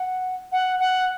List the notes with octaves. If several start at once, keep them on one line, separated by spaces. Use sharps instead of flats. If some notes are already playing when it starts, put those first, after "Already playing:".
Already playing: F#5
F#5
F#5